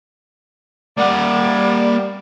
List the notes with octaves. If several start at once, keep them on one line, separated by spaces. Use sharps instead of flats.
G3 A#3 D5 F#5